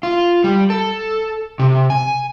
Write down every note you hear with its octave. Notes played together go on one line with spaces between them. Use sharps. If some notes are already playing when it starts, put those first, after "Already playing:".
F4
G3
A4
C3
G#5